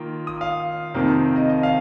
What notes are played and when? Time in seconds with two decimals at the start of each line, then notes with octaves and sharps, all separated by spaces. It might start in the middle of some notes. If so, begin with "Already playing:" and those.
Already playing: D#3 A#3 F4
0.27 D#6
0.41 F5
0.94 F2 C3 D#3 A#3
1.36 D#5
1.50 D#5
1.63 F5